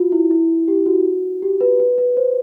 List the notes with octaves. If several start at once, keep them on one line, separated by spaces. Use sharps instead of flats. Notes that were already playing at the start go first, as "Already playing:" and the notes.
Already playing: F4 F#4
E4
E4
G4
F#4
G4
B4
B4
B4
C5